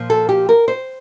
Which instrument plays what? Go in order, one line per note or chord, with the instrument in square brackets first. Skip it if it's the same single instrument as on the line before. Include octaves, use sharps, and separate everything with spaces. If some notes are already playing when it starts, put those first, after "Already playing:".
Already playing: [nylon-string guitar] A#2 F3
A4
G4
A#4
C5